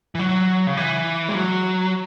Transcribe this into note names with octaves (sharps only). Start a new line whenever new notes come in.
E3
F#3
C#3
E3
G#3
F#3